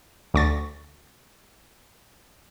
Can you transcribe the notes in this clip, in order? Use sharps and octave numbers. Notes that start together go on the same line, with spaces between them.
D2 C#6 A6